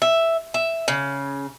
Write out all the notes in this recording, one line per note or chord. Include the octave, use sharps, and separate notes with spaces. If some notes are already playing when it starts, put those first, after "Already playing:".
E5
E5
C#3